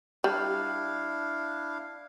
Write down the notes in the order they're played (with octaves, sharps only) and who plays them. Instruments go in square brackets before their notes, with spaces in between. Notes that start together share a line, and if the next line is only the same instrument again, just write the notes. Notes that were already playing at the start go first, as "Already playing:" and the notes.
[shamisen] G3 [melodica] D4 E4 F5